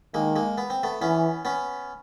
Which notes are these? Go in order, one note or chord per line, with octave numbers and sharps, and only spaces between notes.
D#3 G#3 A#3
G#3 A#3
B3
C4
A3 B3
E3 B3 C#4
B3 C#4